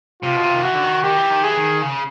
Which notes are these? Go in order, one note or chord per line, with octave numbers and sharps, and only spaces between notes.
C3 F4
B2
C3
D#3
E3 F#4
D3
D#3
D#3 G4
E3
D#3
E3 G#4
D#3
C#3